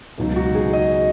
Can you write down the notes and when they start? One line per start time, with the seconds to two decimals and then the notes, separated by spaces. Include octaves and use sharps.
0.18 C#2 B2 F#3 D#4
0.36 F#4
0.55 G#4
0.73 D#5